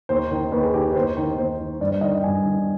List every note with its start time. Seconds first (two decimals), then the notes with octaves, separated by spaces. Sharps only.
0.09 D#2 C5
0.31 D#3
0.52 D#2 B4
0.63 G#4
0.74 D#3 G4
0.90 B4
0.95 D#2 C5
1.17 D#3
1.37 D#2 C5
1.59 D#3
1.80 G2 D5
1.91 D5
2.01 D#3 D#5
2.13 G5
2.24 G2 G#5
2.45 D#3